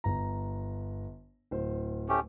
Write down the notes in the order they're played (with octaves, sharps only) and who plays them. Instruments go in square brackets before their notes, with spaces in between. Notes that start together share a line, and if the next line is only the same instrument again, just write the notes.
[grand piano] G1 A#5
D1 C5
[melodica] A3 C#4 G4